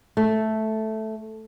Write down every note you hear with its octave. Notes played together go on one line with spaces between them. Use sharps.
A3